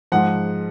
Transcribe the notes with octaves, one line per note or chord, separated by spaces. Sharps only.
G#2 F3 F#5